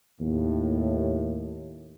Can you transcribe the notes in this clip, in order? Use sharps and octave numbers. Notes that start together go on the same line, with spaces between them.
D#2 A2